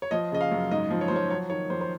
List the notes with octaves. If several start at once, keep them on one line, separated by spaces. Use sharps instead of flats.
C#5
F3 D#5
C#3 D#5
F5
F#2
G#2 D#5
F3
C#5
C5
F3
C#5
F#3 C#5
D#3 C#5
F2 C5
C5